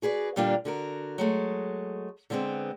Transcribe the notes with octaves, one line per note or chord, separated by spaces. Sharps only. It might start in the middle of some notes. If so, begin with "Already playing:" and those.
F#4 G#4 B4 D5
A#2 D3 G3 A#3 D4 F4
D3 F#4 A#4
F#3 G#3 A3
D3 G3 G#3 B3 C4